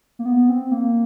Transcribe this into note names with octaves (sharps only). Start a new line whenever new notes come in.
A#3
B3
C4
A#3